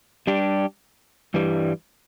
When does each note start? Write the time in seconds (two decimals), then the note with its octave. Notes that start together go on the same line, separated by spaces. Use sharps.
0.27 G3 D4 G4
1.34 G2 E3 G3